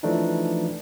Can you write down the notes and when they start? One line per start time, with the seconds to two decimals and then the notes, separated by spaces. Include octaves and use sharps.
0.03 E3 F3 A3 D4 D#4